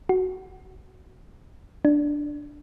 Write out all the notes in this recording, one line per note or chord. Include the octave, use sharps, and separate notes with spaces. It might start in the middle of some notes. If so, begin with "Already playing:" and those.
F#4
D4